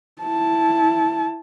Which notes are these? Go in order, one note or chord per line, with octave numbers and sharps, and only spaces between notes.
E4 A5